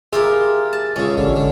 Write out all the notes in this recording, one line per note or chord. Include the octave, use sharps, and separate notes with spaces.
E4 F4 G4 G#4 A#4
A5
C#2 C#3 C#4
A1 D3
D3